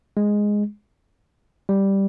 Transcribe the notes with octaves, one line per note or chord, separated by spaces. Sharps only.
G#3
G3